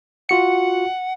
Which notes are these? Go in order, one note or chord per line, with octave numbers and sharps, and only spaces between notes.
F4 F#4 F#5 C#7